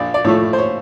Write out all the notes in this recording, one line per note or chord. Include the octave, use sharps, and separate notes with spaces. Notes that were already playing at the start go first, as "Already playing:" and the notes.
Already playing: A#1 D5
D5
A2 F3 A3 C#5
C5
C#5